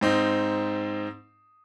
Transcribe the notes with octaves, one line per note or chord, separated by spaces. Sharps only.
G#2 C4 D#4